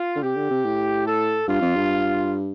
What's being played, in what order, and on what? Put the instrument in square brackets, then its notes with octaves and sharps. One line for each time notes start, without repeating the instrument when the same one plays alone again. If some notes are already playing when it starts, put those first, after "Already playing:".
Already playing: [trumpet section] F4
[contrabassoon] D3
[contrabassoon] C3 [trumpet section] G4
[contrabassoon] D3
C3
A2
[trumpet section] A4
[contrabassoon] G2 [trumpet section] F4
[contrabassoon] F2
G2